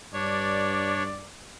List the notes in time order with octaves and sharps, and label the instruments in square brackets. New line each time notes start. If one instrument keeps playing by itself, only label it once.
[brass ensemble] G2 D5 [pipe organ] D4 C#5